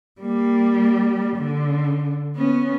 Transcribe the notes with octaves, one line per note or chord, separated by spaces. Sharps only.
G3 A#3
D3
B3 C#4